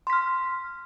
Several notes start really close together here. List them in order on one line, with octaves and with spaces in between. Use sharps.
C6 B6 F6